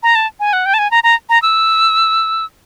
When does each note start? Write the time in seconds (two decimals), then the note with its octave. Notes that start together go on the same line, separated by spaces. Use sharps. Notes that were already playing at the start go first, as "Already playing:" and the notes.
0.03 A#5
0.15 A5
0.40 G#5
0.53 F#5
0.66 G5
0.74 A5
0.79 G#5
0.91 A#5
1.04 A#5
1.29 A#5
1.42 E6